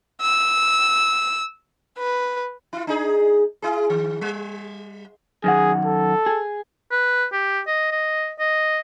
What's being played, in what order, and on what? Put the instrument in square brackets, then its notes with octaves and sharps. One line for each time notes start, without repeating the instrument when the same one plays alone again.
[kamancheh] E6
B4
[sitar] E4 F4
D4 D#4 G#4
E4 G#4
D#3
G3
[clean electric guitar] F#2 D#3 F#5 [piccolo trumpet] G#4
[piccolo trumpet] A4
[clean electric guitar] G#4
[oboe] B4
G4
D#5
D#5
D#5